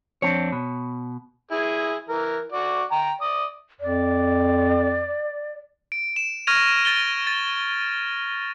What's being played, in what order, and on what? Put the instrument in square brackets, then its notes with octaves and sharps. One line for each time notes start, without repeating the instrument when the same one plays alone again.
[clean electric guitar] F2 C4 D4 [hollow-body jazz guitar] C#5
[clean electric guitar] B2
[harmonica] E4 G#4
E3 A#4
F#4 D5
G5 A#5
D5 D#6
[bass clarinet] F2 [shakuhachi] D5
[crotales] D7
E7
C#6 F6 G#6 A#6 D#7 F7
A6 D7 G7
A6